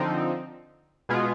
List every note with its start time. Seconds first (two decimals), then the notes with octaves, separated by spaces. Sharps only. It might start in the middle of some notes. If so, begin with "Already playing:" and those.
Already playing: D3 F3 C4 D#4
1.09 B2 G#3 B3 F4 G#4